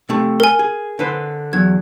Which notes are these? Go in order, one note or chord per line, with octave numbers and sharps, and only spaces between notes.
C3 A3
A#4 G#5
G#4
D3 B4 C5
E2 F#3 G#6